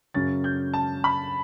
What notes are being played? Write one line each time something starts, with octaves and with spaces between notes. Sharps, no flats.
F#2 C#3 F#3 C#4 A6
G6
A5
B5